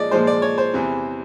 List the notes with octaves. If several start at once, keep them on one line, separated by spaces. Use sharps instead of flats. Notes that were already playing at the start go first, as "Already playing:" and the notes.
Already playing: A#2 F3 G#3 D5 D#5
A#2 F3 G#3 C5
D5
C#5
C5
E2 C3 E3